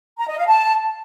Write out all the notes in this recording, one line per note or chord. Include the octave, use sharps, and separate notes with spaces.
A#5
D#5
F5
A5